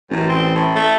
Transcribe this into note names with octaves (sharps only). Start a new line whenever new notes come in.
A1 F#2
C4
A2
A3